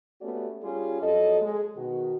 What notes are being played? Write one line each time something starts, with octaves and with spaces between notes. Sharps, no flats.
A3 B3 C#4 F#4 G4 D5
G3 C#4 F4 G#4
F2 F#3 A4 D#5
G#3
B2 D#3 F#4